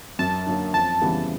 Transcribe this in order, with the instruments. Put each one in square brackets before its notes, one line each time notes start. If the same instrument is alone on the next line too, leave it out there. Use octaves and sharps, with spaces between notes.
[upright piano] F#2 [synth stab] A5
[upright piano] D3 F#3 A#3
[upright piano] F2 [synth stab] A5
[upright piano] C#3 E3 G3 B3